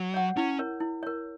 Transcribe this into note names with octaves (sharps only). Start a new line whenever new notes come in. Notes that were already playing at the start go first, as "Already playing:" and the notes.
Already playing: F#3
C#5 F#5
C#4 E4
A#4 C#5
E4
A#4 C#5